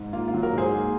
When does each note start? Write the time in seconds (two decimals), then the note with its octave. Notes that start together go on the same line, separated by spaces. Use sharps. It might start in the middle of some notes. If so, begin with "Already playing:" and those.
Already playing: G#2
0.13 A#3 F4
0.28 F4
0.34 F#3
0.43 F#4 A#4
0.53 G#2
0.58 G#4 C5
0.73 A#3